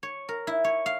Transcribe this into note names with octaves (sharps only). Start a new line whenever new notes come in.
C#5
A#4
E4
C#5
F5